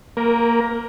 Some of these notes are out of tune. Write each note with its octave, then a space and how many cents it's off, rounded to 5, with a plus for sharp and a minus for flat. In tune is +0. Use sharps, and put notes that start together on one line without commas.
A#3 -5 A#4 +20